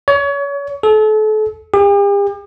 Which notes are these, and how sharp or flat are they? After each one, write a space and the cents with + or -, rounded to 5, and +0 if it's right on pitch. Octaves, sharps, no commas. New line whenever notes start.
C#5 +30
A4 -35
G4 +45